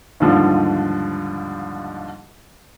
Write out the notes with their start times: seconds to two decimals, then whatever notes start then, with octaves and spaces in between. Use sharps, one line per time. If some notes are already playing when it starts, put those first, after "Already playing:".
0.20 D#2 G#2 D3 F3 G3